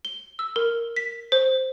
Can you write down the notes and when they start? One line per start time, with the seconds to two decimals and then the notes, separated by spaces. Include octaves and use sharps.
0.05 G7
0.39 E6
0.56 A#4
0.96 B6
1.32 C5